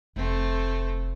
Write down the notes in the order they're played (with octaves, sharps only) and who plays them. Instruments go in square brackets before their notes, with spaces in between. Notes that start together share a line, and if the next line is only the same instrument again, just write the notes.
[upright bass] F1 [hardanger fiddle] A3 C4